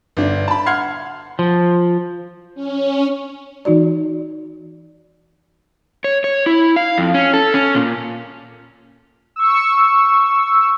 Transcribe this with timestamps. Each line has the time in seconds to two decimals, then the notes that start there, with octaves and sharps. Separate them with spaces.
0.17 G1 D4
0.48 A5 B5
0.66 F#5 C6 F6 G#6 C7
1.39 F3
2.55 C#4
3.65 E3 D#4 F#4 D5
6.04 C#5
6.24 C#5
6.46 E4
6.76 F5
6.98 F2
7.14 C#4
7.33 A4
7.54 C#4
7.75 A#2
9.36 C#6 E6